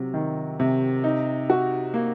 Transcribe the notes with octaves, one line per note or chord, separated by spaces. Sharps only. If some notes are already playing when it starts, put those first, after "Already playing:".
Already playing: C3 F#3
D#3
C3
D#4
F#4
A#3